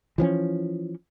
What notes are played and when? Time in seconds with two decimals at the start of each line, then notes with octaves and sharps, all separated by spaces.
0.18 E3 F3 C4 C#4